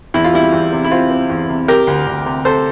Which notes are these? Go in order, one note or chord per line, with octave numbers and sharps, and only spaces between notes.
E2 E4
F4
G3 E4
E2
C3
E4
C4 F4
C4
E2
C3
C3 G4 A#4
D2
D2
C3
C3 A4 C5